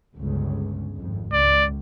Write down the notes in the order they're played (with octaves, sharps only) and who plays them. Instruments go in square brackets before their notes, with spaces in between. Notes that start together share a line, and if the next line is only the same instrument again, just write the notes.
[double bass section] G1 C#2 C#3
G#1 F2
[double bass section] C#2 [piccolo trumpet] D5